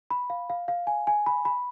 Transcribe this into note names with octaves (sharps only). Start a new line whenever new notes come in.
B5
F5
F5
F5
G#5
G#5
B5
B5